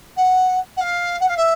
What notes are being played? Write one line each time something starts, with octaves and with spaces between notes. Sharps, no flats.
F#5
F#5
F5
F#5
F5
E5